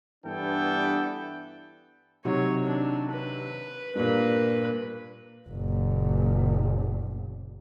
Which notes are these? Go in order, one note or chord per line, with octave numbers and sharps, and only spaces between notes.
G2 E3 B3 D4 A4 G5
C3 D#3 F#3 C#5
D4
B4
G2 A#2 A#3 B4
F#1 A#2